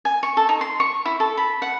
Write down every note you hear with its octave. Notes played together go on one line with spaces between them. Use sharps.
G#5
C#6
A4
D#4
C6
C#6
E4
A4
B5
F#5